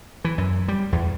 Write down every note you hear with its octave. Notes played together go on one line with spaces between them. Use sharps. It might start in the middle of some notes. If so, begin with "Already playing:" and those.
E3
F#2
G3
E2